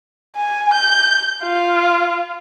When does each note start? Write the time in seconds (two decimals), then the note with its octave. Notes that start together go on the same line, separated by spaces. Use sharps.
0.37 G#5
0.74 G6
1.43 F4